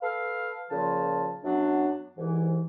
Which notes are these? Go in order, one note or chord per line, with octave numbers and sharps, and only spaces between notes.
A4 B4 F5
A#2 C#3 F3 F4 A5
F#2 F#3 B3 D4
C2 G#2 E3